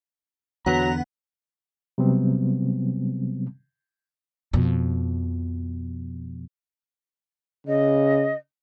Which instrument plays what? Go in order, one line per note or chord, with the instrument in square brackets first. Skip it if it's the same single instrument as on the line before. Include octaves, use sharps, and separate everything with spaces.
[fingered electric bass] E2 D3 [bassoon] F#3 [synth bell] B3 F#5 [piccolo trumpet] A#5
[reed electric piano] C3 F#3 G3 B3 C4
[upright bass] F2 B2
[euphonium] C#3 [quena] D#5